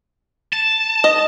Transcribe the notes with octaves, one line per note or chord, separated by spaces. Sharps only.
A5
D#5